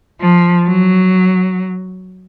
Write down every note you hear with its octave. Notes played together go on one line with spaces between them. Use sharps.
F3
F#3